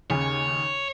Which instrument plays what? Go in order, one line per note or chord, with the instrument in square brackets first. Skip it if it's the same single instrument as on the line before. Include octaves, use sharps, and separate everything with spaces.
[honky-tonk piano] D#2 C#3 G#5 [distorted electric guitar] C#5